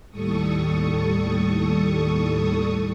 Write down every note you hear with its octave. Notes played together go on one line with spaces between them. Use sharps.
D#2 A2 G3 A4 C#6 D#6